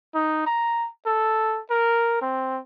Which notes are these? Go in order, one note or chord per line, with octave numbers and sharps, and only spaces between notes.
D#4
A#5
A4
A#4
C4